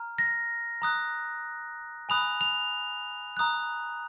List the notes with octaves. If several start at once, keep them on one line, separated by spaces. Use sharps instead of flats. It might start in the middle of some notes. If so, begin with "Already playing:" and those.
Already playing: A#5 F6
A#6
A#5 D#6 F#6
G#5 B5 D#6 F#6 F7
F7
A#5 D#6 F#6